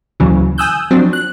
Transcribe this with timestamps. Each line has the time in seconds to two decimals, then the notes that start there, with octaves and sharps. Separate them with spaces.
0.20 D2 A#2 C#3 E3 F#3
0.58 G#5 D#6 E6 F#6 G6
0.91 F3 F#3 C4 D4
1.13 F#6